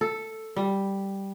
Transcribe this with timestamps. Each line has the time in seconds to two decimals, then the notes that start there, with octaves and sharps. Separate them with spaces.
0.01 A4
0.56 G3